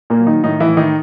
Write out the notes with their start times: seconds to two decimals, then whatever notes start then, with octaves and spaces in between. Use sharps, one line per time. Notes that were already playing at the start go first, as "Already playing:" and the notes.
0.10 A#2 A#3
0.19 F#3
0.26 D#3 D#4
0.44 A2 D#3 D#4
0.60 E3 E4
0.69 A2
0.77 D#3 D#4